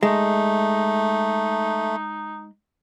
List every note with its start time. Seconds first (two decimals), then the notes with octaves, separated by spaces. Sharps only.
0.03 G#3 A3 D#4